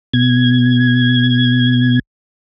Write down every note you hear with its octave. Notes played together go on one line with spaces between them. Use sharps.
B2 G#6